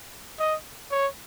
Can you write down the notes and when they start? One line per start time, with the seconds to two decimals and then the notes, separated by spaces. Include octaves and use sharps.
0.40 D#5
0.91 C#5